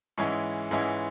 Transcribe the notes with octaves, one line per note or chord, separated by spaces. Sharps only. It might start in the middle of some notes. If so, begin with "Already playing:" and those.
G#2 E3 G#3 C#4 E4 C#6
G#2 E3 G#3 C#4 E4